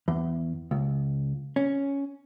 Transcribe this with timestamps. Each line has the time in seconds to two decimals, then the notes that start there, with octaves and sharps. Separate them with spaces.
0.08 E2
0.71 C#2
1.56 C#4